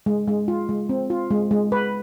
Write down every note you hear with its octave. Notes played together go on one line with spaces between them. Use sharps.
G#3
G#3
F4
G#3
C4
F4
G#3
G#3
B4